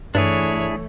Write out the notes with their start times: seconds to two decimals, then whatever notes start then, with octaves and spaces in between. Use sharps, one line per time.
0.15 G2 E3 A3 D4 E4 G#4 C#5